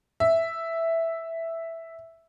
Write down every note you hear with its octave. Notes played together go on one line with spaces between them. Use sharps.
E5